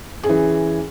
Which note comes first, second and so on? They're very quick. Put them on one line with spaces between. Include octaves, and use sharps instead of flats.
G#4 C#4 E3